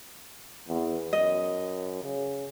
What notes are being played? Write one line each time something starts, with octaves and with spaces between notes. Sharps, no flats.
E2
F#2 D#5
C#3